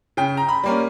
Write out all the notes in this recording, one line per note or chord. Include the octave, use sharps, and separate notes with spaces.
C#3 G5
A#5
B5
G3 A#3 C#4